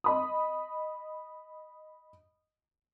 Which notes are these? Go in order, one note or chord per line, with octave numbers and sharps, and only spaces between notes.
D#5 B5 D#6